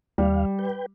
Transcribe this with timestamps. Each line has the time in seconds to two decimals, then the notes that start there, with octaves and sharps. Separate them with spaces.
0.18 D#2 G3 F5
0.59 B4 G5